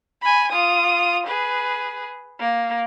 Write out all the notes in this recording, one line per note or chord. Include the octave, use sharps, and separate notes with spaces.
G#5 B5
F4 D#6
G#4 B4
A#3